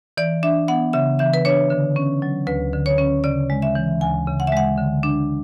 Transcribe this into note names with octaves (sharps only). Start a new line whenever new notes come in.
E3 D5
D4 E5
B3 F#5
C#3 E5
E3 E5
B4
D4 C#5
D3
C#4
F#3
D2 B4
D3
C#5
C#4
C#3 D5
G#3
E5
E3
D2 G#5
C#3
F#5
E5
G#3 F#5
D3
D4